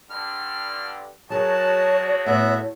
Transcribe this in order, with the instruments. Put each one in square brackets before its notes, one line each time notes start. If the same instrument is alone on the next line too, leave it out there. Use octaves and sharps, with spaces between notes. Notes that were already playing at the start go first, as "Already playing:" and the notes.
[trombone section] G2 D3 [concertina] F6
[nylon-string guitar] F#3 G#4 A#4 [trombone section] G#3 A3 F#4 [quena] C#5 [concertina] A5
[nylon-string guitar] A2 [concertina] B3 E5